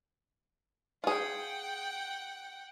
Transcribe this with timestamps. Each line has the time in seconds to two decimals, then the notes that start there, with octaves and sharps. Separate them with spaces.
1.04 F4 G#4 F#5 G5